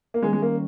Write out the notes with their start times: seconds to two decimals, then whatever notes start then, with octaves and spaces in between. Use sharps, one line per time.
0.14 A#3
0.22 D#3 G3 G#3 C#4
0.33 G#3
0.42 A#3